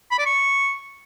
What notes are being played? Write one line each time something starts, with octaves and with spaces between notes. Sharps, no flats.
B5
D5
C#6